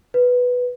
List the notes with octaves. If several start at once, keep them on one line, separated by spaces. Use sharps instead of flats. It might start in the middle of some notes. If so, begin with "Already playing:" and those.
B4